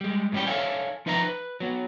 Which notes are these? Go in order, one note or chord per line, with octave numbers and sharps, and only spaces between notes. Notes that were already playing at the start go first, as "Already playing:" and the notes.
G3 G#3
A2 E3 G3 C#4 G4
A4 C#5 E5 F5 G#5
F3 D#4 B4 E5 F5 A#5
B4
F#3 B3